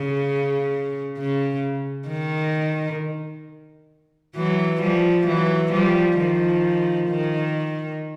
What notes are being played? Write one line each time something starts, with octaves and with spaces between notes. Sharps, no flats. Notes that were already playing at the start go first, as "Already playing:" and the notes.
Already playing: C#3
C#3
D#3
E3 F#3
F3 G3
E3 F#3
F3 G3
D#3 F3
D#3